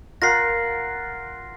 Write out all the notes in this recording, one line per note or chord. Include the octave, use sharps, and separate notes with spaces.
F4 A#4 F#5 A#6 C7